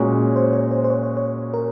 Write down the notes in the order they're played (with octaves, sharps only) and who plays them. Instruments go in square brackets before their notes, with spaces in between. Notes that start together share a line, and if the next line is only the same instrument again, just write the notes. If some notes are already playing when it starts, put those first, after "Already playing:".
Already playing: [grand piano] A#2 G#3 C#4 F#4 [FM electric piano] C#5
[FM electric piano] C5
C#5
C5
C5
C#5
C#5
C#5
A#4